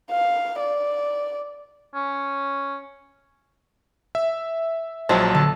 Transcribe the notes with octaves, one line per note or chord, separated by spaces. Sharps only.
F5
D5
C#4
E5
A#1 F3 F#3 G#3 C4 A5
D3 A4